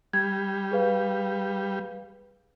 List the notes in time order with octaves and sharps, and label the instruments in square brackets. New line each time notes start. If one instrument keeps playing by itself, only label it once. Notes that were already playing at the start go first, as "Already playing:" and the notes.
[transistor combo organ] G3 [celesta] G#6
[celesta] G#4 B4 F5